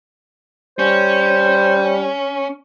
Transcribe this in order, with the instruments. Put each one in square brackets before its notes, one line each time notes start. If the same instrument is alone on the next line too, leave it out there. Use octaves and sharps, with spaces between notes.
[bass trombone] G3 [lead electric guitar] C#4 [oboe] C5